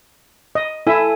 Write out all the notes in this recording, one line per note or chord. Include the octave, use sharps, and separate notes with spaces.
D#5
E4 A4 E5 G#5